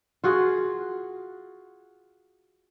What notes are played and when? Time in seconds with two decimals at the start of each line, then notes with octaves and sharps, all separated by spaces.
0.24 F4 F#4 G#4